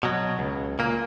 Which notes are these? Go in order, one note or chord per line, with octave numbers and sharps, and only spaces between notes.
B2 F#3
C#2
A#2 A#3